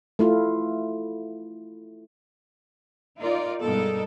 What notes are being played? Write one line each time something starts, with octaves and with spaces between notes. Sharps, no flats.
A3 E4 F4
D#4 F4 A#4 D5
G2 B2 G#3 D#4 A4 A#4